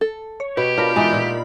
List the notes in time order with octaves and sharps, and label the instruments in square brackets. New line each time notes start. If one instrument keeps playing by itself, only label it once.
[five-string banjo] A4
[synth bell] C#5
[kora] B2 [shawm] G4 [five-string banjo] B4
[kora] D4 [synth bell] F4 A#4 B5
[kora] E3 D#4 D5 [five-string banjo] G#3
[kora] A#2